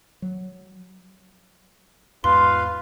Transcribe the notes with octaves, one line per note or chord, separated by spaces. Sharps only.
F#3
E2 G#2 F4 B4 F5 C6